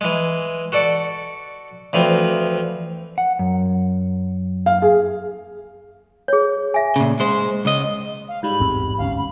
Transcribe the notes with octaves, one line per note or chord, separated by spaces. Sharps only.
E3 G#3
F#4 A4 D5
D2 E3 F3 C4
F#5
F#2
F5
G#4
G#4 C#5
E5 G#5
A#2 C#3
G#3 C5
C#2 D#5
F5
G#2 G3 B5
A1 E2 C4
G1 D2 C#4 F5
B5